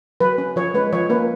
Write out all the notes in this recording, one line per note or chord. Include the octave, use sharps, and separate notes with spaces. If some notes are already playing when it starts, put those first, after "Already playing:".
F#3 B4
C#4
F3 C#5
G#3 C#4 B4
F3 C#5
A#3 C#4 B4